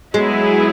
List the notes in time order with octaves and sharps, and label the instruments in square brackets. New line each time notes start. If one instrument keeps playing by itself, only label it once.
[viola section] F#3 B3 E4 G#4 [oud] G#3